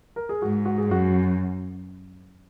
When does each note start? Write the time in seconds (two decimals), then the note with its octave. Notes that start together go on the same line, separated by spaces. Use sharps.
0.16 A#4
0.29 G#4
0.42 G#2 F#4
0.65 F#4
0.78 G#4
0.88 F#2 F#4